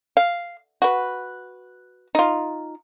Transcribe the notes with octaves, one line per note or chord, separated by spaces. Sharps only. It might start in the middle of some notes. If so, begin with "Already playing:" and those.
F5
F#4 B4
D#4 F4